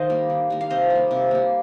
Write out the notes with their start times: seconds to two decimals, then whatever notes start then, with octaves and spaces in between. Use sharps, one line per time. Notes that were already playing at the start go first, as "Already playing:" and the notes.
Already playing: D#3 C5 D#5 F5
0.10 G3 A#3
0.30 D#3
0.50 G3 A#3
0.61 F5
0.70 C3 C5 D#5
0.90 G3
0.95 A#3
1.11 C3
1.31 G3 A#3